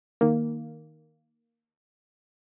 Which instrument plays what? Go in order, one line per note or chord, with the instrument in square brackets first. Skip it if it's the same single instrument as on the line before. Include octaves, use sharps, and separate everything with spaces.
[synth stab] D#3 A#3